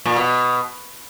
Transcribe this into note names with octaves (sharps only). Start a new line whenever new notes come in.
A#2
B2